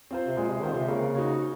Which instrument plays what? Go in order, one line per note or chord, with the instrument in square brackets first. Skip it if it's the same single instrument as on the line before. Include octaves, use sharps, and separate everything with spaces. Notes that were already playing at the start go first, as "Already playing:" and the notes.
[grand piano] C4 F4 C5
[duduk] C3
[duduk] A#2 [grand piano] G#3
[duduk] C3
[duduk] D#3 [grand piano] C4 F4 C5
[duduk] C3
[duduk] C#3 [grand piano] A#3
[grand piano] D#4 F#4 C#5